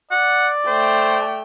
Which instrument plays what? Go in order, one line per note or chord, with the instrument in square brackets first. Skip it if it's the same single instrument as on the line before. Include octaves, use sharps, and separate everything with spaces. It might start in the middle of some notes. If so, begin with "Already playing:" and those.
[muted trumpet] D5 [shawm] F#5
[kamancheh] A3 G5 [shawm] C5